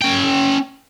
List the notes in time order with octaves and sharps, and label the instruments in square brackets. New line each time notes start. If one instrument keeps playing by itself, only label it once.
[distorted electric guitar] C#4 G5